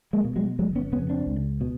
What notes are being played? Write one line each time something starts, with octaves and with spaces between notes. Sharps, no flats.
G#3 A#3
B2
F#3 G#3
G1 F#3 G#3
B3 C#4
F2 C#3 B3 C#4
C4 D4
C#2
B2